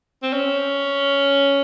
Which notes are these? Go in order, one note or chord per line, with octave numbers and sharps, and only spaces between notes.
C4
C#4